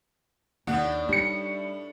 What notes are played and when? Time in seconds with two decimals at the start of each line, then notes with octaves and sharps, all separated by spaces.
0.67 D#2 A2 D4 F#5
1.09 G3 D#4 C#7